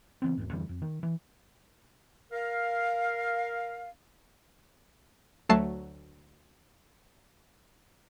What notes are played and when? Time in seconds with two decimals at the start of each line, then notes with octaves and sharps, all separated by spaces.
0.22 C#3 E3 B3 C4
0.37 F#1 D#2 G#2
0.53 F2 D3 E3 G3
0.69 F2
0.82 D#3
1.03 E3
2.32 A#4 F5
5.49 D2 F#3 A3 A5 C7